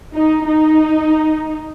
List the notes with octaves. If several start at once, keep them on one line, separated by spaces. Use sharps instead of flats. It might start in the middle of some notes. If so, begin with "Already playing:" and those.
D#4
D#4